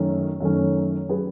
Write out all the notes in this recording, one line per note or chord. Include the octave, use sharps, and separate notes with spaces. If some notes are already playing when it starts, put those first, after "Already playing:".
Already playing: F#2 D#3 A3 C#4
F#2 D#3 A3 C#4
F#3 C#4 G#4 B4